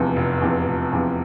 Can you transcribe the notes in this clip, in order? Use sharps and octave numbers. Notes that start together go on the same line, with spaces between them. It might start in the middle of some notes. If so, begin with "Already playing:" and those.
Already playing: F1 E2 C3 F3
F1
E2 C3 F3
F1
E2 C3 F3